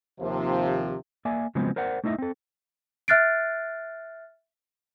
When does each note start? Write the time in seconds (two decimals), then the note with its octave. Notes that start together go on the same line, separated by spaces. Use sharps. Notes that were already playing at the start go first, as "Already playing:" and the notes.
0.20 D#2 C3 F3
1.25 A#3 D5 E5 G#5
1.55 C#3 F3 F#3 G#3 B3 C4
1.76 A#4 C5 D5 F#5
2.04 A3 D#4 E4 C5 D#5 E5
2.18 C4 A4
3.08 E5 F6 F#6 A6 C7 D7